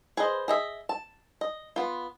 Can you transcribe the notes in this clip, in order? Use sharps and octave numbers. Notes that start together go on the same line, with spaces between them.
G#4 B4 C5 D#5
G#4 D#5 E5
A5
D#5
B3 F4